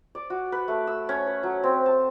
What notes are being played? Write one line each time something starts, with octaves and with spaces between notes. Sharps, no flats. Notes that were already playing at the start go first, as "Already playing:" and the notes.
D5
F#4
B4
A3
E6
C#4
B4
F#3
C4
A5